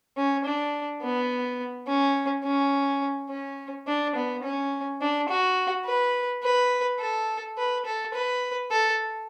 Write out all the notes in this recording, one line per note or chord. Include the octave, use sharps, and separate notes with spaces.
C#4
D4
B3
C#4
C#4
C#4
D4
B3
C#4
D4
F#4
B4
B4
A4
B4
A4
B4
A4